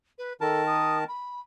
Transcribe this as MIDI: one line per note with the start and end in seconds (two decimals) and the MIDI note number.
0.18 0.33 71
0.41 1.04 51
0.41 0.63 69
0.41 1.04 70
0.41 1.04 81
0.67 0.98 87
1.08 1.40 83